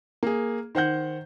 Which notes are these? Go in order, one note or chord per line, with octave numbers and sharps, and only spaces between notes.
A#3 G#4
D#3 C5 F#5 G6